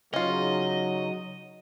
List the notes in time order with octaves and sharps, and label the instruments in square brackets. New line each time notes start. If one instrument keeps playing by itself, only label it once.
[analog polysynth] C#3 D#4 [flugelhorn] F#3 [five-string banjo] C#4 F4 [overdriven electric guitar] D#5